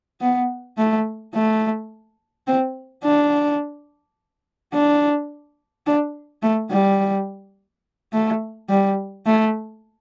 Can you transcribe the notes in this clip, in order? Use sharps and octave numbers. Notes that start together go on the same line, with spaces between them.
B3
A3
A3
C4
D4
D4
D4
A3
G3
A3
G3
A3